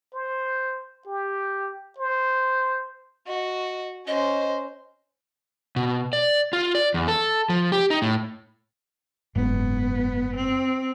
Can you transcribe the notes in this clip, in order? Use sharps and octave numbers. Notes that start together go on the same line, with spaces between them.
C5
G4
C5
F#4 D#5
C#4 C5 D#5
B2
D5
F4
D5
E2
A4
F3
G4
D#4
A2
F#1 G#2 B3
C4